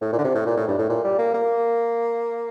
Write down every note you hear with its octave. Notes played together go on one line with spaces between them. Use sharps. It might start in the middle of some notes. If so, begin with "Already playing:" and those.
A2
A#2
D3
C3
A2
A#2
A2
G2
A2
A#2
G3
A#3
A#3